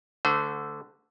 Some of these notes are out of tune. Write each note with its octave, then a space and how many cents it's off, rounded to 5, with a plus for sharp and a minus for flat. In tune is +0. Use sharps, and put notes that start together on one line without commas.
D3 +0 A3 +0 C5 -35